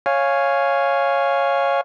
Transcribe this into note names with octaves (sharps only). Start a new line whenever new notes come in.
C#5 F5 G#5